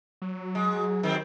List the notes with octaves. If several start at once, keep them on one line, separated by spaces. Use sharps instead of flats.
F#3
G#3
D#3 F#3 C4